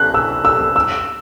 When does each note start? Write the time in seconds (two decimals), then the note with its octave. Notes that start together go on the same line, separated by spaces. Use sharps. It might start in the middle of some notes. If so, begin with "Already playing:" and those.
Already playing: F#6
0.14 E6
0.45 E6
0.76 E6